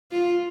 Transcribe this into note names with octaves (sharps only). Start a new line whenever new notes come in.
F4